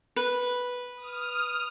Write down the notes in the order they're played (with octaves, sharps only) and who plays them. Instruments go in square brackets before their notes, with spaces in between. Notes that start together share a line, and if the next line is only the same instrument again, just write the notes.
[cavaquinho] B4
[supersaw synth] D#6 F6